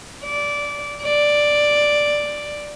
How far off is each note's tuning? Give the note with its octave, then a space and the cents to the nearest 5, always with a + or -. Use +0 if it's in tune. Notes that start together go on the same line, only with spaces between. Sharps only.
D5 -15
D5 +5